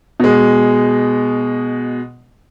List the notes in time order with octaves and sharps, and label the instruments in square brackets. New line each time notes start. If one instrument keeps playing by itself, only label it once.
[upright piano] B2 G#3